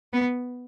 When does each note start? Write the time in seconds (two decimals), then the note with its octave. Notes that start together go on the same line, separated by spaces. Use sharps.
0.13 B3